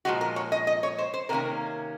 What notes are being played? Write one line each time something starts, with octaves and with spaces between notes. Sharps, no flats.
A#2 F3 G#3 F#4
A#4
C#5
D#5
D#5
C#5
C5
C5
C3 D#3 A#3 C#4 A#4